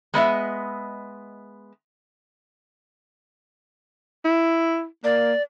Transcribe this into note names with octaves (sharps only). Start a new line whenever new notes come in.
G#3 B3 D#5 E5
E4
A#3 D5